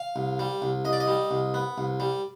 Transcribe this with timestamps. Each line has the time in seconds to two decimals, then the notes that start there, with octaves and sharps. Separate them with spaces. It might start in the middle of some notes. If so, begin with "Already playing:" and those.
Already playing: F5
0.16 C2
0.39 G3
0.62 C2
0.85 C2 D#5
0.93 D5
1.00 D#5
1.08 G3
1.31 C2
1.54 B3
1.78 C2
2.00 G3